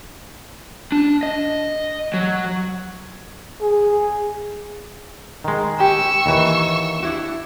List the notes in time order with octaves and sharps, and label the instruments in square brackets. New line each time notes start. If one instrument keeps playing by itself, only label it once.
[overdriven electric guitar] D4
D#5
F#3
[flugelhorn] G#4
[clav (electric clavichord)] D#3 G#3
[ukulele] G4 [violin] C#6 E6
[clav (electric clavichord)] D#2 E3
[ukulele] D4 E4 F#4